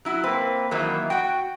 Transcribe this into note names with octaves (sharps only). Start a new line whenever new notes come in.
F#3 E4 F#4
A#3 C4 B4
D#3 E3 F#3 A#3 E4
F#4 F#5 G5